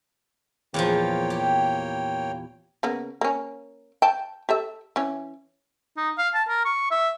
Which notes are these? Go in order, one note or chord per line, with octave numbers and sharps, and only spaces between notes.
E2 A#2 F3 A#3 C#5 G5
G4
C#3 A#3 B3
A#3 C#4
G5 A5
G4 A4 E5
E3 C#4
D#4
F5
A5
A#4
C#6
E5